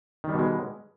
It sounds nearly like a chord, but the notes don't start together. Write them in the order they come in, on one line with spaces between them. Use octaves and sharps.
D#3 G3 B2 G#3